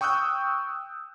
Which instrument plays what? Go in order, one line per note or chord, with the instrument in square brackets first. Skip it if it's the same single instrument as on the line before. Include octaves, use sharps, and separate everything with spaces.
[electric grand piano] G5 C#6 D#6 E6 F#6 G6